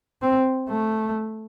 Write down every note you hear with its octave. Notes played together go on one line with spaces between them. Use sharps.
C4
A3